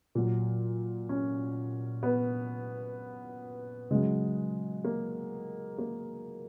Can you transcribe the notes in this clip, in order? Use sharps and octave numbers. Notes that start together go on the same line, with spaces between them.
A#2 F#3
C#4
B3
C#3 F#3 G#3
A#3
A#3